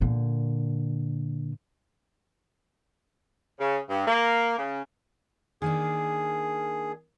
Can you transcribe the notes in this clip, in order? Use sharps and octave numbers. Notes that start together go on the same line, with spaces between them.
A#2 D3
C#3
G2
A#3
C#3
D#3 A#3 D4 G#4